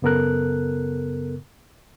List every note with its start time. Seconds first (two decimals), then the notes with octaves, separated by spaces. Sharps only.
0.02 F#2 C#3 B3 A4 A#4 F#6